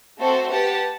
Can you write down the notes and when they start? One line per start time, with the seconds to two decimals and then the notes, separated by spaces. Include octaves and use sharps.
0.20 A3 C4 F#4 A4 C5
0.51 G4 B4 F#5 A5